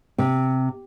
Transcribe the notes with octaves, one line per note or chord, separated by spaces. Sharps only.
C3